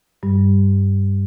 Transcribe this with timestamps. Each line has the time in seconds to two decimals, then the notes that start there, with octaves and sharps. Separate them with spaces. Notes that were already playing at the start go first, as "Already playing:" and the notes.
0.23 G2 G3